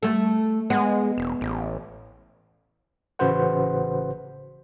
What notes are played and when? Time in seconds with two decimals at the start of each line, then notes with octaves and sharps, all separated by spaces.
0.03 A3 A4
0.70 G#3 B3
1.18 E1
1.41 A1
3.19 A1 C#3 F#4 B4 C5 F#5